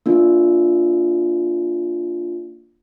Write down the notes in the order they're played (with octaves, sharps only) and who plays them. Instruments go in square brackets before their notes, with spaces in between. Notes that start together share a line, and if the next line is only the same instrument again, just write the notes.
[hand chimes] A#3 D4 F4